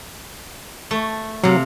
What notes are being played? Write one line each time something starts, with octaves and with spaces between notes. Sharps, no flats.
A3
C3 F#3 F5